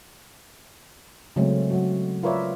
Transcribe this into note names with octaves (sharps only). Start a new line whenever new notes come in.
C#3 F#3 G#3 A3 C4 C#4
F#3 F#4
F4 A#4 B4 C#5 D5 E5